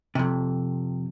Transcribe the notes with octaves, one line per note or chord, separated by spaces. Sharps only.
F2 C3